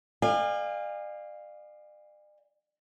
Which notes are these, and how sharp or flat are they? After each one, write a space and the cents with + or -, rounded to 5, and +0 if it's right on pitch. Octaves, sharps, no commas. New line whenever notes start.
D5 +45 F5 +0 G#5 -35